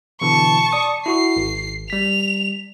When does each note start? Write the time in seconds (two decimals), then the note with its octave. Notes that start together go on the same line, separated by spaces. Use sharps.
0.21 B2 D3 E3 A5 C#6
0.73 D5 D#6
1.06 E4 F#4 C#6 C7
1.37 G#1
1.90 G3 B6 F7